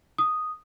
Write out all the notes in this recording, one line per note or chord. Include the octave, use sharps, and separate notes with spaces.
D#6